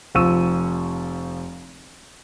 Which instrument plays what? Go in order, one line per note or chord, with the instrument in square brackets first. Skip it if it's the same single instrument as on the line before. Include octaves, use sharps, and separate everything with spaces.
[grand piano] F1 F3 C#6 E6 D#7